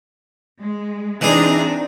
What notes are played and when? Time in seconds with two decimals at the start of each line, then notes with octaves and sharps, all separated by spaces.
0.61 G#3
1.21 E3 C4 D4 D#4 G#4